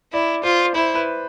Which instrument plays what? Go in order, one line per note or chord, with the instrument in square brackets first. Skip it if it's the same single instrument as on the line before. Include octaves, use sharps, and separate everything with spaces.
[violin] E4 [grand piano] D5
[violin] F4 [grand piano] C5
[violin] E4 [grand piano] C5
[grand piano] B4